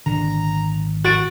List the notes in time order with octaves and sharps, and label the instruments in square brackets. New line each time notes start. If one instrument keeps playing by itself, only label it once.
[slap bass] G#1 A#2 [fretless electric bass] D3 [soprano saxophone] A#5
[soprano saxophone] F#4 [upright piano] A6 D7